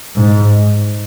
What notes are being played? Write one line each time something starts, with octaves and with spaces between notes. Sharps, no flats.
G#2